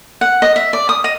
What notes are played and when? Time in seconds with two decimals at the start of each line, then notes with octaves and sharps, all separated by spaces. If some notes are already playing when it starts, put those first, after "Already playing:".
0.21 F#5
0.42 D#5
0.56 E5
0.73 D5
0.89 D#6
1.04 D#5